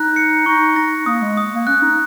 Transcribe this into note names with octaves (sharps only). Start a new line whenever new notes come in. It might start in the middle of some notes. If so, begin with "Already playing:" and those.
Already playing: D#4 F#6
C#7
D#4 C#6
D#4 A#6
A#3 D#6
G#3
D#6
A#3
C#4 F#6
D#4